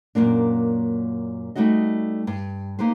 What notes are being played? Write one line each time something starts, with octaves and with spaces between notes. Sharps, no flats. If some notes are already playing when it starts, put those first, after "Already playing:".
F#2 A#2 A#3 D4
G3 A3 D#4 F#4 D#5
G2
A#3 D#4 G4 B4 C5